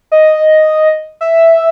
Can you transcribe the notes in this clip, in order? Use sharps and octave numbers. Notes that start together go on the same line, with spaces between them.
D#5
E5